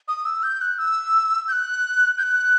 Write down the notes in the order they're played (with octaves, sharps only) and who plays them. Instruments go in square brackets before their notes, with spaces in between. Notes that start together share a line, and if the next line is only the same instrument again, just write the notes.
[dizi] D#6
E6
G6
F#6
E6
G6
F#6
G6
F#6